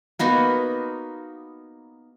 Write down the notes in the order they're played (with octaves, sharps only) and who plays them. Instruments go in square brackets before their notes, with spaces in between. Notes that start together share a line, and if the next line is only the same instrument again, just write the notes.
[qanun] A#3 B3 D#4 F#4